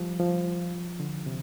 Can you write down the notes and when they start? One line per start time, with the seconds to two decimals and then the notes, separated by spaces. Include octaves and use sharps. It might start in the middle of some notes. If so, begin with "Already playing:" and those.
Already playing: F3 G3
0.20 F3
1.00 D3
1.26 C3